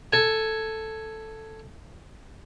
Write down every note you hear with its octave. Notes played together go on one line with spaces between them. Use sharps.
A4 G#5